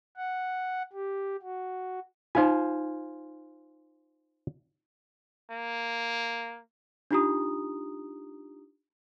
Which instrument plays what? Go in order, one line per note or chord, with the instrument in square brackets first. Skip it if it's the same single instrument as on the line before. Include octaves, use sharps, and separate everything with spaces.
[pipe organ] F#5
G4
F#4
[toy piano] D#4 F4 [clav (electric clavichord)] C5 F5 G#5
[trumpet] A#3
[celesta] D4 D#4 F4 G4 A#5 D#6